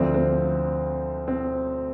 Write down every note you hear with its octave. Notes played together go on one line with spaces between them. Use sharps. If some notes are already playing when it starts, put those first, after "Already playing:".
Already playing: D2 D3 F3 C4
C4
C4